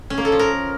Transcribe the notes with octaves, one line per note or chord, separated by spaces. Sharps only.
C#4
A#3
A4
F3
A#4